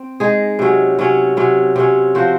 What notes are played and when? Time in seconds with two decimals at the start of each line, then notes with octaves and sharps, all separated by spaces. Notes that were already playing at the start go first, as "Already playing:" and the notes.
Already playing: C4
0.20 G#3 D#4 G#4
0.59 C3 F#3 C#4
0.99 C3 F#3 C#4
1.37 C3 F#3 C#4
1.76 C3 F#3 C#4
2.15 F3 C4 F#4 C5